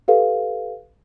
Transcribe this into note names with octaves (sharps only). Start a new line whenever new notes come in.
G4 A4 B4 F5